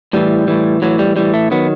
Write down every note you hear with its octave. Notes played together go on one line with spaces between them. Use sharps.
A2 E3 G3
A2 E3
A2 E3 F#3
G3
A2 E3 G3
A3
D#3 F#3 B3